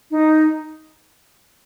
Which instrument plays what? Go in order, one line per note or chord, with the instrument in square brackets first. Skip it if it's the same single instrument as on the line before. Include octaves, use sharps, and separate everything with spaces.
[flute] D#4